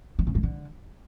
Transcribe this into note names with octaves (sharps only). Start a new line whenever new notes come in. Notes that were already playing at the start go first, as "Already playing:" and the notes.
D#3
C#3
G2
D3